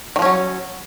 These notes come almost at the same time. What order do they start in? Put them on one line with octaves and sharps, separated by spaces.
D#3 F3 C#4 F#3